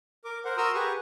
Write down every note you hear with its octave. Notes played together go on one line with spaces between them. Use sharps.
A#4 D6
A#4 C5 F#5
F#4 A#4 A#5 C6 D#6 E6
G4 G#4 B4 F#5 C#6 D#6